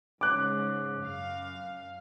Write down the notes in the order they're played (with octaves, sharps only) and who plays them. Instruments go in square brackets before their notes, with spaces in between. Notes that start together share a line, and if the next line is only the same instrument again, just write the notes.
[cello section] G#2 C#3 [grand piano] D6 F#6
[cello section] F#2 F5